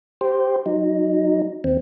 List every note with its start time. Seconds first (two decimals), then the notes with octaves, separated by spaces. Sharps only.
0.21 G4 C5
0.66 F#3 D#4
1.64 D#2 C4